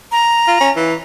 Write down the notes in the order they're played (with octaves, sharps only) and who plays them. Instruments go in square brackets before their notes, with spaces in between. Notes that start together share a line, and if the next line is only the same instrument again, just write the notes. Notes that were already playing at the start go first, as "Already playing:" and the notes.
[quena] A#5
[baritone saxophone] F4
C#4
E3